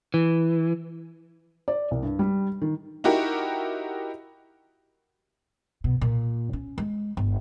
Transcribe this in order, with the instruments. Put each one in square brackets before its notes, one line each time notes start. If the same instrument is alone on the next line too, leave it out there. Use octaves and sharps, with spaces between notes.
[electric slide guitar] E3
[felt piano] D5
C2
G2
G3
D#3
[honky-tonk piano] D#4 E4 F#4 G4 A#4
[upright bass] B2
A#2
C#4
G#3
G1